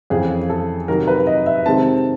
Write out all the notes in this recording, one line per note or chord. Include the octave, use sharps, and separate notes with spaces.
F2 C#3 E3 G#4
A4
C3 D#3 F#3 A#4
B4
D#5
E5
C3 D#3 G#3 C4 A5